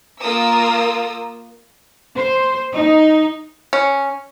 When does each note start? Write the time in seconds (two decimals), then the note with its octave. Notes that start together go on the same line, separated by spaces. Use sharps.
0.20 A#3 F4 A#4 D#6 E6
2.16 C5
2.74 D#4
3.73 C#4